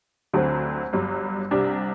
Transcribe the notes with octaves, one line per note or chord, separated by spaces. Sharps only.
D2 D3 F#3 C4
G1 G2 F#3
C2 C3 G3 D4